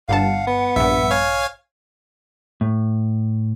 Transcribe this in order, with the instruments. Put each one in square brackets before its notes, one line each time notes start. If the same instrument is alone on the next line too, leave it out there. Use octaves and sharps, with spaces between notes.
[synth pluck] G1 G2 A5 [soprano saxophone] F5 [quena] F#5
[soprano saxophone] B3
[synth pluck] A#1 G2 [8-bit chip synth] E5
[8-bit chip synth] C#5 F5 G#5
[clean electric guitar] A2